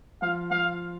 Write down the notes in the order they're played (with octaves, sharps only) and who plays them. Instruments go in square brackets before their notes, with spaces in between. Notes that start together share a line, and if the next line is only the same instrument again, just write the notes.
[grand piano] F3 [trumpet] F5
[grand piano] F3 [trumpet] F5